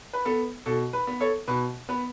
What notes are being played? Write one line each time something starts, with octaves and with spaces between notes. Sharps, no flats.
B4
B3 A4
B2 A4
B4
B3
A4 C#5
B2 B4
B3 B4